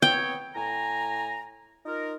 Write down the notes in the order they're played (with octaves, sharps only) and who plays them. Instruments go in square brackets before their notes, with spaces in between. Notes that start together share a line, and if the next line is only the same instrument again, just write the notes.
[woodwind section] B3 C4 C#5 [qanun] G5
[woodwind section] A2 G#5 A#5
D#4 F4 A#4